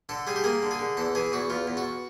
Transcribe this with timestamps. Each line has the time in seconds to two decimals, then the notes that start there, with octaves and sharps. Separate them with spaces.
0.09 D3 A4
0.27 G3 G#4
0.36 G4
0.44 A#3 G#4
0.63 D3
0.71 G#4
0.79 D3
0.97 E2 A4
1.15 E3 G#4
1.32 E2 F#4
1.50 E2 F4
1.67 E2
1.77 F#4